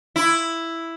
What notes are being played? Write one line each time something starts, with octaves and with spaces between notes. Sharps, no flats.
E4